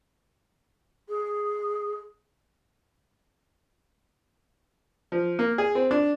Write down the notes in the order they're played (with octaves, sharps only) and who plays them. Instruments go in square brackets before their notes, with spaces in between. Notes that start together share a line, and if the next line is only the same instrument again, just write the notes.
[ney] G#4
[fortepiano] F3
A#3
G#4
C4
D4